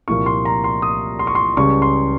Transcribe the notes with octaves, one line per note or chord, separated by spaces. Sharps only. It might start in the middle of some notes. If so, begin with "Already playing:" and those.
C2 A#2 F3 A#3 C#6
C6
A#5
C6
D#6
C6
C#6
C6
C#2 C#3 G3 C#4 C#6
C6